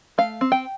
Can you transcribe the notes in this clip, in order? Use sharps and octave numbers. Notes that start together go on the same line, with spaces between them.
A3 F5
C4
G5